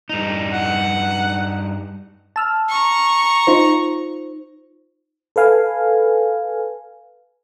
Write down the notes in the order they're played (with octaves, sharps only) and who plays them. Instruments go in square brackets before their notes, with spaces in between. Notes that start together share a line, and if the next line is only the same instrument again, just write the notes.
[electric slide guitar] G2 D#4
[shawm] F#5
[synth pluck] A5 E6 F6
[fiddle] A#5 C#6
[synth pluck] D#4 F4 C5
[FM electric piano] A4 B4 F5 G#5